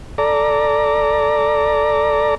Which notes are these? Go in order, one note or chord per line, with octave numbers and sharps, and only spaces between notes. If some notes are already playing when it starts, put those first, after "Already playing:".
A4 D5 A#5